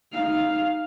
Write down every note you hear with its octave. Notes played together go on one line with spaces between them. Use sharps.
D#4 F5